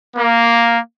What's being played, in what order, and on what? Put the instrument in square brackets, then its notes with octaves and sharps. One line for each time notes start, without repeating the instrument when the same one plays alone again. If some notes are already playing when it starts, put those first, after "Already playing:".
[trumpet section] A#3